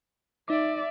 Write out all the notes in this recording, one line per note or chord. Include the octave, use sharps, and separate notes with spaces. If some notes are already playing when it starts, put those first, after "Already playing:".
D#4 D5 E5 D6